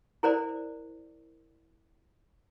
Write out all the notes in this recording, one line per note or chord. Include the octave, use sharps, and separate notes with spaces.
E4 A#4 C5 D5